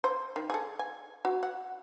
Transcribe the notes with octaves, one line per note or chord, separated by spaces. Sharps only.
C5
D#3
G#4 A4
G#5
F#4
F#5